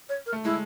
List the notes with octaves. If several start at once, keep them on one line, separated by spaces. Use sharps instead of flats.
C#5
A#4
A3
G#3 E4